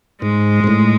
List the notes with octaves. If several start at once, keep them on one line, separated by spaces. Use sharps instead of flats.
G#2 G#3
G#2
A2